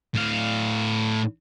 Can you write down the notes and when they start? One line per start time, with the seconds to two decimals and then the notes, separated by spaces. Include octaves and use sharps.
0.15 A2 F5